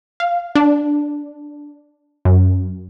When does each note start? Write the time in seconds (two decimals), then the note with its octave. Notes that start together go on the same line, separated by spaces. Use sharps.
0.20 F5
0.55 D4
2.25 F#2